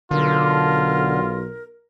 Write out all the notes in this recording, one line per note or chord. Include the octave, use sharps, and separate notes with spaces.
B1 D3 F4 A#4